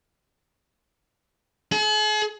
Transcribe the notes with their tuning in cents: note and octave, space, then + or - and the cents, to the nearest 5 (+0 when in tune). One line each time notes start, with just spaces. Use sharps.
G#4 +45